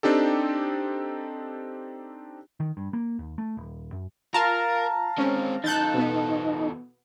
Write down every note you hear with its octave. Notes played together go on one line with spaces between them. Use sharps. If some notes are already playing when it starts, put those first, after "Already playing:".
C4 D4 D#4 G4 A4
D#3
G2
A#3
D#2
A3
D#1
F#2
F4 A#4 F5 A5 A#5
G#3 C4 C#4
E2 D#4 A4 F#6 G6 A6
B2 B3